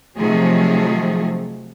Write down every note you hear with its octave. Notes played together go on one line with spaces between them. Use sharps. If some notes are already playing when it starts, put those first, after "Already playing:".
C3 D#3 F3 F#3 A3 G#4